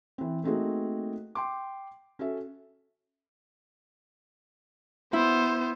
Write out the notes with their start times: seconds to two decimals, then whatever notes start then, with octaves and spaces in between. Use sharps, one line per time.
0.18 E3 C4
0.44 A3 A#3 C4 D#4 F#4 G#4
1.35 G5 C6 D6
2.19 C#4 F#4 A4 E5
5.13 B3 E4 C5